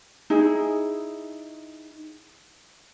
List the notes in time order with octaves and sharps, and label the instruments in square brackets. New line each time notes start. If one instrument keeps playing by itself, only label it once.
[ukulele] D#4 E4 G#4